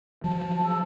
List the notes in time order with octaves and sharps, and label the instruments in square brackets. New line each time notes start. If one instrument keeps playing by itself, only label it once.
[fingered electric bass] F3 F#3 [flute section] A5
[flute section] G#4 A5 E6